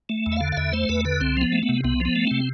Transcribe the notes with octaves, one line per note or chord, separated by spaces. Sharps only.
A3
E2
E5
D3 F5
F5
E2 E5
A3 C5
E2 B4
D3 B4
C2 C4
F3 B3
A3
B3
C3
C2 B3
F3
B3
A3
C3 C4